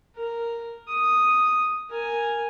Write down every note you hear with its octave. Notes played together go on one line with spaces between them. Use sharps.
A#4
D#6
A#4 G#5